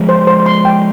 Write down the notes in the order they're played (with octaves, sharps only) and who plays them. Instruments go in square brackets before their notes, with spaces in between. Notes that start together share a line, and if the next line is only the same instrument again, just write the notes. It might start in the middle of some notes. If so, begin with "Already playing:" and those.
Already playing: [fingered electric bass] F3 G#3
[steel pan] C5
C5
C6
G5